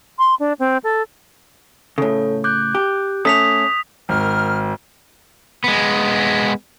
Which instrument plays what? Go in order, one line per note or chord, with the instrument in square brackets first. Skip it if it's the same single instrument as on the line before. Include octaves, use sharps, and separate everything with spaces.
[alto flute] C6
D4
C4
A4
[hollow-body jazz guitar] A2 C#3 [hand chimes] A4 C#5
[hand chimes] D6 F#6 G6
[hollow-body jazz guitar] G4
[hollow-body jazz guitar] A3 C#4 A4 [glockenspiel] D#6 B6 F7
[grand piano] G#1 [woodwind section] D#4 A#4 F6
[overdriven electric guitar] G#3 B3